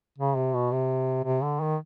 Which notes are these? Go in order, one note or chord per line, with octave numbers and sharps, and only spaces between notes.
C#3
C3
B2
C3
C3
D3
D#3